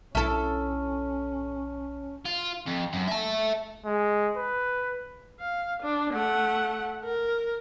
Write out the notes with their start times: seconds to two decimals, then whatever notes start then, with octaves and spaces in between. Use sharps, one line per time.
0.15 B1 C#4 E4 A4 A5 C#6 F6
2.26 F4
2.66 F2
2.93 F#2
3.08 E5 A5
3.85 G#3
4.37 B4
5.40 F5
5.82 D4
6.13 A3 F#5
7.04 A#4